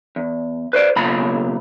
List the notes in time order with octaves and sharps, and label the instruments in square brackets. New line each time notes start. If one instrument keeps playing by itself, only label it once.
[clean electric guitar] E2
B4 C5 D5
B1 A#2 C#3 A#5 B5